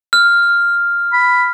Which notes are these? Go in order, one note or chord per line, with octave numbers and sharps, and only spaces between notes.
F6
B5